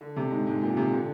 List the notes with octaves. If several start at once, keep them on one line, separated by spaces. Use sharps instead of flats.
D3
C3
G#2
G#2
A#2
C3
D3